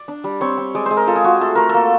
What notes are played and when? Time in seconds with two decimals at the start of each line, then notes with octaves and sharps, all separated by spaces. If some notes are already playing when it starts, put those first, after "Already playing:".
Already playing: D5
0.08 D4
0.24 G3
0.41 C4 C#5
0.58 C4
0.75 G#3 D5
0.86 G#3 C5
0.97 A#4
1.07 F4 A4
1.16 G#4
1.24 F4 F#4
1.41 A3 A4
1.55 A3 A#4
1.69 A4
1.75 A#3